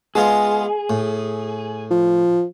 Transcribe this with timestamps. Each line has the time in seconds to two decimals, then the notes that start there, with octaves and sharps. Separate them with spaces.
0.15 G#3 B3 F4 G#4
0.90 A2
1.90 F3